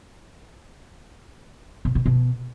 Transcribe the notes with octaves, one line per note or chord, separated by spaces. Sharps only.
B2
B2
B2